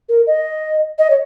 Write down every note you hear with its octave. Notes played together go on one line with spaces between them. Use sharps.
A#4
D#5
D#5
C#5